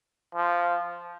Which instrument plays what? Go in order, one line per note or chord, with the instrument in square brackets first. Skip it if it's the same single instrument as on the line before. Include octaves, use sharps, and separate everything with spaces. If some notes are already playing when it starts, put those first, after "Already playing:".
[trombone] F3